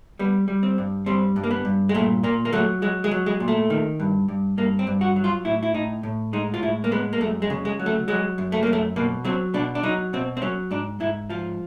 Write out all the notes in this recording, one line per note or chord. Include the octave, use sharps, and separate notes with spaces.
G3 B3
G3
C4
G2
G3 C4
G2
A#3
B3
G2
G#3
A#2 A3
A#2 A#3
A#3
F#3 A3
F#3 G#3
G#3
F#3
G#3
A#2
A3
D#3
G2
G2
G2 A#3
C4
G2
F#4
F#3
F4
A2 E4
E4
A2 D#4
A2
G#3 D#4
F4
A2 E4
A#3
G#3 B3
A#3
F#2 A3
G#3
C#3
G#3
F#3
A3
F#3 G#3
F#2
A3
F#2 A#3
A3
B2 A#3
F#3 C4
B2 D4
D4
F#3 D#4
B2 C4
C4
F#3 C#4
G#2 D4
G#2 E4
F3 F4